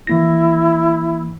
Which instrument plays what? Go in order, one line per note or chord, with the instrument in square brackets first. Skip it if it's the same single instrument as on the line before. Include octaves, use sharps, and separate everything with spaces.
[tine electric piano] E3 A#3 A#6 [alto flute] E4